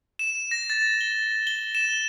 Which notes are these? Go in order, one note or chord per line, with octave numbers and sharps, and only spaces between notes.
E7
A#6
A6
G7
G7
E7